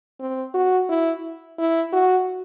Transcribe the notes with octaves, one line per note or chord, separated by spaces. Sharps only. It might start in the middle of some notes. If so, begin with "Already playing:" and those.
C4
F#4
E4
E4
F#4